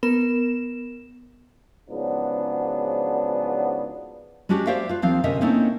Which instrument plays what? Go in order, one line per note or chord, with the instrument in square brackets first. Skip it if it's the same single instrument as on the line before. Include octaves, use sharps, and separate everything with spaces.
[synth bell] B3 A#4 E7
[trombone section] G#2 C#3 F3 F#3 B3 D4
[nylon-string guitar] G#3 C#4 D4 F#4 G4
G4 C5 D5 E5 F5 G5
F4 B4
D#2 F3 C4 F5
D2 C3 C#4 A#4 D#5 E5
A3 A#3 C4 C#4 D#4 E4